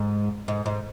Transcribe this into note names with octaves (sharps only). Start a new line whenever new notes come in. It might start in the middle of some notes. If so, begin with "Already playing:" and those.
Already playing: G#2
G#2
G#2